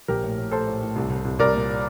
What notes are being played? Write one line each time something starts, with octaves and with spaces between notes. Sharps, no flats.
A#1 G4 A#4
A2
A2
A2 A4 C5
A2
A2
C2
C2
C2
C2 A#4 D5
A#2